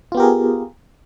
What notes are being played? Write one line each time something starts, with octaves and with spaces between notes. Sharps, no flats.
B3 F4 G4 G#4 A#4